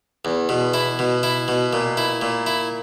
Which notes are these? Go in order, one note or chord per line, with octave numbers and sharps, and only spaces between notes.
E2
B2
E4
B2
E4
B2
A#2
E4
A#2
E4